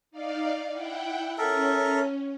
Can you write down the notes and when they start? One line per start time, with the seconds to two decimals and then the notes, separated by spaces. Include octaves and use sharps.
0.11 D#4 D5 F5
0.71 E4 F#5 G5
1.38 C#4 A4 A#4 E5